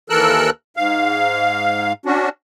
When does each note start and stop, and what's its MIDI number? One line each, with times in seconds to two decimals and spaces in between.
0.10 0.50 39
0.10 0.50 52
0.10 0.50 69
0.10 0.50 70
0.10 0.50 88
0.10 0.50 90
0.77 1.93 44
0.77 1.93 77
2.06 2.29 61
2.06 2.29 62
2.06 2.29 66